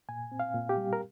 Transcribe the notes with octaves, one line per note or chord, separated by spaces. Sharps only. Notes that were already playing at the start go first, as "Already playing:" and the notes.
A#2 G#5
C4
F5
A#2
G4
G3
A#4